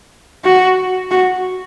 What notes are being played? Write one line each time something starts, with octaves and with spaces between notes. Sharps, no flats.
F#4
F#4